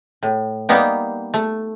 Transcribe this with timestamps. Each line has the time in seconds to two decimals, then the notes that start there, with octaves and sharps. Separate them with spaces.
0.23 A2
0.69 G3 A#3 B3 D#4 G4
1.34 A3